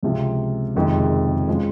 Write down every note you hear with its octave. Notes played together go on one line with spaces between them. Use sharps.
C#2 C3 F3 C4 F4
F#1 F2 C3 D#3 G#3
C#3 F3 G#3